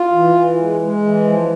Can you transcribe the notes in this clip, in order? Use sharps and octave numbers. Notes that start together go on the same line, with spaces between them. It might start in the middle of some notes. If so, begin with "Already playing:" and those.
Already playing: F4
E3
E3
G#3
G#3
E3
F3